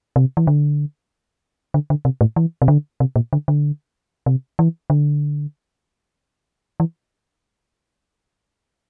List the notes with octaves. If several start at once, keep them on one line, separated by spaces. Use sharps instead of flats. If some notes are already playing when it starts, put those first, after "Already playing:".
C3
E3
D3
D3
D3
C3
A2
E3
C3
D3
C3
A#2
D3
D3
C3
E3
D3
E3